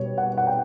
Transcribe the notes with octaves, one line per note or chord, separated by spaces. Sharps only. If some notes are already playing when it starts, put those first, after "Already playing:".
Already playing: B2 G3 C#5
F#5
F#5
G5